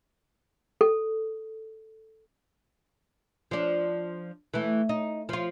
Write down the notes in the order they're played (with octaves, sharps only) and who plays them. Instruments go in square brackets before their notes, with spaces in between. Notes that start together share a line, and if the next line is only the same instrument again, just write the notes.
[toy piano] A4
[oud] F3 D4
E3 A3
D#4
F3 F4